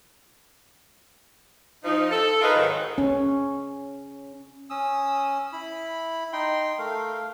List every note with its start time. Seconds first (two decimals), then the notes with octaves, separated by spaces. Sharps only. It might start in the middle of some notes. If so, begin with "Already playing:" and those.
1.84 F3 D#4
2.11 A4
2.41 D#4 F4 G#4 A#4 B4 D#5
2.56 G#2 D#3 F#3
2.98 C#4
4.70 C#4 D#6 E6
5.53 E4 B5
6.33 D#4 G5 C6
6.79 A3 A#4 F5